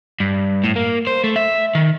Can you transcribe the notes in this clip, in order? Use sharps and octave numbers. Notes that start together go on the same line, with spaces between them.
G2
A2
A#3
C5
A3
E5
D#3